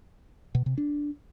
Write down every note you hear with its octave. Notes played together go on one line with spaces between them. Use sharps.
B2
C3
D4